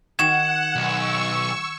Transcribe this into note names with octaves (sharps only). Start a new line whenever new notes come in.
D#3 F#4 F#5 G#6 E7
B1 C#6 E6